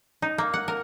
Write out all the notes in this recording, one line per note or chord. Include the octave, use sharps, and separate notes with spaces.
D#4
A#3
F#5
A#4